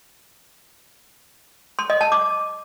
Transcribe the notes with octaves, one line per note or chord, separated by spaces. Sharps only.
C6
D#5
A5
D6